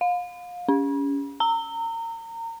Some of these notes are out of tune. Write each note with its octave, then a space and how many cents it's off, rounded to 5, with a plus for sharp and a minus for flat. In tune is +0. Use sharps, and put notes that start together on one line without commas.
F5 +30
C#4 +25
A#5 -30